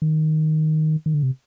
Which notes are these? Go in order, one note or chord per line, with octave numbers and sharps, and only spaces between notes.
D#3
D#3
D3
C3